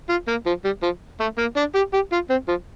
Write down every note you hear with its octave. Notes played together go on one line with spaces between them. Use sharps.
F4
A#3
F3
G3
F3
A3
A#3
D4
G4
G4
F4
C4
F3